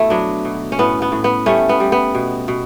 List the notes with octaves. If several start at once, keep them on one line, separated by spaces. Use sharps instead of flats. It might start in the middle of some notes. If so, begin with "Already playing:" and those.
Already playing: B2 A3 E4
F#3 B3 D4
B2
C#4
A2 B3
B3
A2
B3
G3 A3 C#4
B3
G3
B3
B2
B2